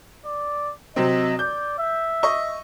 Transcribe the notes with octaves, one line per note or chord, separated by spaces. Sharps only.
D5
C3 F#3 C4 D#5
D5 G6
E5
D#5 C#6